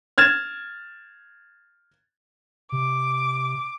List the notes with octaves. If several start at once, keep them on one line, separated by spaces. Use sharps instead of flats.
F6 G#6 A6 E7
C3 D6